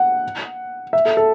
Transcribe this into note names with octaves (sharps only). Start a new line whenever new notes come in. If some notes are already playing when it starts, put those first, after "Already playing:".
Already playing: F#5
E5
A4
A4